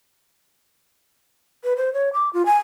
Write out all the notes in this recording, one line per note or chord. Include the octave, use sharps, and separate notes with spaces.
B4
C5
C#5
D6
F4
G#5